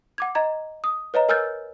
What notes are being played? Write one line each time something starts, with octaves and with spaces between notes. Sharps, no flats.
F#5 D6 G#6
D#5 A#5 G#6
D#6
B4 C#5 D#5 A#5
A#4 G#5 E6 F6 G6 A6